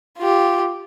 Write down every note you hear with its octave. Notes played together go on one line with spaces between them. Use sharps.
F4 G4